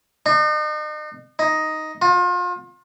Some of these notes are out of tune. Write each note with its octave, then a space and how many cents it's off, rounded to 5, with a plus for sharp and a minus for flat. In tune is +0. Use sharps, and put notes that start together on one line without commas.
D#4 -40
D#4 +5
F4 +35